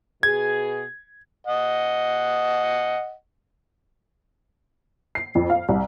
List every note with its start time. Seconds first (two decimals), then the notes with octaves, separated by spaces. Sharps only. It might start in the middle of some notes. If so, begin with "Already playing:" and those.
0.23 B2 G#4 G#6
1.47 D#5 F#5
5.15 C7
5.35 F2
5.50 F5
5.69 C2